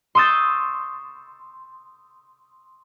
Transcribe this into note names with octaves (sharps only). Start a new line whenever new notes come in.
C6 C#6 D#6 E6 G6 A6